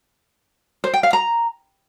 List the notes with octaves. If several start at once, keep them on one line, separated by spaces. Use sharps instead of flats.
C5
G5
F5
A#5